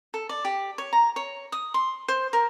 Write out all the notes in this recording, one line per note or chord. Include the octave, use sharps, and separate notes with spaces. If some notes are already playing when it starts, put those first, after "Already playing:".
A4
D5
G4
C#5
A#5
C#5
D#6
C6
C5
A#4